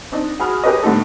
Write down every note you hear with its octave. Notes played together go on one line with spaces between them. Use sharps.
C4 D4 D#4
F#4 G#4 B5 F6
G4 G#4 A#4 B4 C#5 D#5
A2 D3 G3 B3 D#4 A4